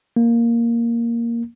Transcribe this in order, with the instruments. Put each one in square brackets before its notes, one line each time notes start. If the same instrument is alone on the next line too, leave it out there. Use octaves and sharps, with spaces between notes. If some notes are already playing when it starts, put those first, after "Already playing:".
[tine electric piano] A#3